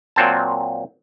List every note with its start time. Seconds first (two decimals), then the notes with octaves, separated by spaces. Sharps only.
0.16 A#2 F#3 C4 A5